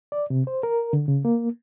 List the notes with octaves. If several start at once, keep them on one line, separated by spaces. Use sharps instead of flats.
D5
C3
C5
A#4
D3
C#3
A#3